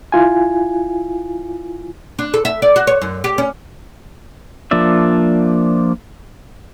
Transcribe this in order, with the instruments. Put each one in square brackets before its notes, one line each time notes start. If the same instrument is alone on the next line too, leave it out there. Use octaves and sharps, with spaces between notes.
[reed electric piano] E4 F4 G#5
[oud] D4
A4
E5
D5
F#4
C#5
F#2
G4
C#4
[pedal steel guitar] F3 A#3 D4 D5 E5